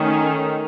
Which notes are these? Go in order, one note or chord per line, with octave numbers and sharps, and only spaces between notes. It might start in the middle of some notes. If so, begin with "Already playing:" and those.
Already playing: D#3 A3 C#4